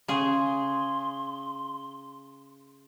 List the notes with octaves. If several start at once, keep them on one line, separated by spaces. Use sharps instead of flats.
C#3 G#4 C6